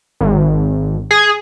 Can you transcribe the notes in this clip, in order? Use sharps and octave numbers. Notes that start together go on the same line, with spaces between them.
G#1
G#4